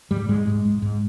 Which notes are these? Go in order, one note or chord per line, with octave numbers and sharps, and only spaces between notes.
G#2 G3
G#2 G#3
G#2
G#2
G#2